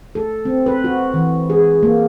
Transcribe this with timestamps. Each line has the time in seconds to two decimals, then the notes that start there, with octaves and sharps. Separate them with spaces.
0.15 A4
0.45 C4
0.66 B4
0.84 F#4
1.14 E3
1.50 G#4
1.83 A#3